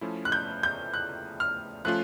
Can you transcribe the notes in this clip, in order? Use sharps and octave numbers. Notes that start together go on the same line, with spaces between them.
F3 A3 C#4 E4
F#6
G6
G6
F#6
F6
F3 A3 C#4 F4 F#6